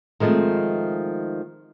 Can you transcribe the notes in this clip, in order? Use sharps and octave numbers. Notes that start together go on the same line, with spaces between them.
D#3 F3 G#3 A3 C4